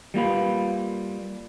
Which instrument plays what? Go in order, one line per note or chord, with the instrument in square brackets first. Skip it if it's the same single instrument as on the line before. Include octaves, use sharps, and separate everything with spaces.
[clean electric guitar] G3 A#3 F4 B4